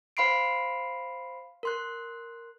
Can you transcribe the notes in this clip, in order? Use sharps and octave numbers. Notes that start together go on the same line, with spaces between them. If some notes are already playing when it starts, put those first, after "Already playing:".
C5 F5 B5 C6 C7 D7
A#4 C6 F#6